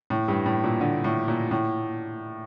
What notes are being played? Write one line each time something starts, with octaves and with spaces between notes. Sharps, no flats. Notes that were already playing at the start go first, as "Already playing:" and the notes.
A2
G2
A2
A#2
D3
A2
A#2
A2